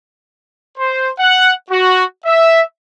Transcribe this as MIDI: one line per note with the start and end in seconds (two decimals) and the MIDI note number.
0.78 1.10 72
1.19 1.52 78
1.71 2.04 66
2.25 2.61 76